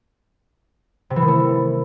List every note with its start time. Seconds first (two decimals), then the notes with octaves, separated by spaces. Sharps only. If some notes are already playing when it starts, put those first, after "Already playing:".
1.10 C3
1.16 E3
1.22 D#3
1.28 A3